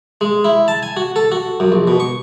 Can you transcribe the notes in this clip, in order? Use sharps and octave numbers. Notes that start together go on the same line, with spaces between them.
G#3
E4
A5
G#5
F#4
A4
F#4
F#2
A#1
B2
C#6